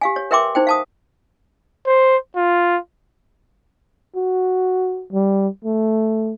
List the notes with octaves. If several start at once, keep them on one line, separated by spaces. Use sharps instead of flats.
G4 F5 G#5
C#5
A#4 B4 E5 G5 C6 D6
D#4 C5 G5
F5 A5 D#6
C5
F4
F#4
G3
A3